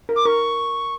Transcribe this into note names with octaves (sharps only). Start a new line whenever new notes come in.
A#4
D6
A#4 C#6